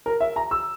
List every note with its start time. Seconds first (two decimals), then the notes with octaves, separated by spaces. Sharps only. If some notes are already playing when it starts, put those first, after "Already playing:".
0.06 A#4
0.20 E5
0.36 A#5
0.51 E6